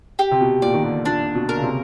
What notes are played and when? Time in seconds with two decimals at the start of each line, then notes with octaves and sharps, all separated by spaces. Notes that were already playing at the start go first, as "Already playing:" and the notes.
0.19 G4
0.31 C3
0.41 B2
0.62 A#2 D5
0.74 D#3
0.84 D3
1.05 A#2 D4
1.35 B2
1.49 A#4
1.57 C#3
1.63 C3